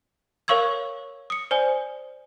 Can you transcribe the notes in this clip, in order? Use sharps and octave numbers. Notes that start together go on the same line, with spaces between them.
A#4 C#5 F5 C#6 E6 G#6
D#6 C#7
C5 D5 G#5